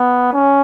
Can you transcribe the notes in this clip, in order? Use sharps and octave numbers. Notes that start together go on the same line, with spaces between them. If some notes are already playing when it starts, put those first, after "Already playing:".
Already playing: B3
C#4